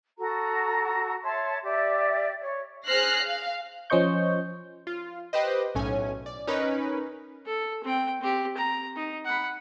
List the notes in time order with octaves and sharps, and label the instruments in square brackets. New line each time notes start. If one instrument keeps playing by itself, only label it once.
[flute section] F#4 A4 A#5
C#5 E5 A5 C6
G4 D5 E5
C#5
[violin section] G#4 C5 F6 F#6 A#6 C7
F5
[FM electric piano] F3 C#4 C5 D#5 C#6 G6
[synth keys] F4
G4 B4 C5 D#5
B1 A2 C#4 G#5
D5
C#4 D#4 A#4 B4
[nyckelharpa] A4
C4 G5
C4 G4
A#5
D#4
F#5 B5